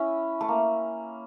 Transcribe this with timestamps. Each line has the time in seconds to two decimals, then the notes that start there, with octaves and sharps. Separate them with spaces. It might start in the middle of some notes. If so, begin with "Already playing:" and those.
Already playing: C#4 E4
0.41 A3
0.48 A#3